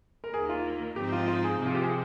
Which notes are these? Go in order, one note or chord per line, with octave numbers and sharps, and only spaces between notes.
A#4
D#2 D#3 A#3 G#4
F4
G#2 F3 C4 D#4 G4
F4
F4
G#4
C3 F3 C4
F4
G4
G#4